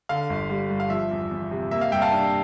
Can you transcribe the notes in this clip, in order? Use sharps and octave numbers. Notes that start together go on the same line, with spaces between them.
D3 F5
G1
G3
G2
F5
F3 E5
E2
E2
C3
A#3 E5
F5
G2 E5 G5
F5 A5
D4